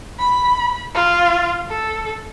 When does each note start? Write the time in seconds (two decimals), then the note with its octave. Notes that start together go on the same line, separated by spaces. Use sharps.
0.19 B5
0.94 F4
1.69 A4